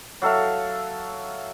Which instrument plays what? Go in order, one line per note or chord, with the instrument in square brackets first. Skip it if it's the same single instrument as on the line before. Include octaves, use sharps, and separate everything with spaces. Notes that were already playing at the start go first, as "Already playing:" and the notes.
[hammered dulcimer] F#3 A4 E5 F5